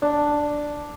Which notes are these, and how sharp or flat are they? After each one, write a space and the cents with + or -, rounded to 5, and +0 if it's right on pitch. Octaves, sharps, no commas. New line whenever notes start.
D4 +0